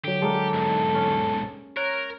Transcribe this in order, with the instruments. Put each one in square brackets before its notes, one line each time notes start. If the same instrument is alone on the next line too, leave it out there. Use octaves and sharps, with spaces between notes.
[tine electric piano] D3 F#3 [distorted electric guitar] G4
[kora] G#3 A#3 D4 [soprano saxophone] A4
[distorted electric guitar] B1 G#2
[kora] C#4
[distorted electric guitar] A#4 [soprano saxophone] C#5 [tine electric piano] F#6